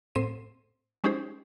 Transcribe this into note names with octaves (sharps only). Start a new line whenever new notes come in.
A2 C4 C5 C7 D#7 E7
G#3 C#4 D#4 G4 G#4 C5